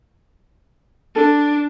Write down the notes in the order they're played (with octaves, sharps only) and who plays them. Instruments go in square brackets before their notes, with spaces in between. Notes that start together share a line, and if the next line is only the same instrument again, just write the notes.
[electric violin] D4 [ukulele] A4